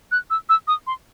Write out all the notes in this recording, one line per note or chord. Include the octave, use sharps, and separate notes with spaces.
F#6
E6
E6
D#6
C6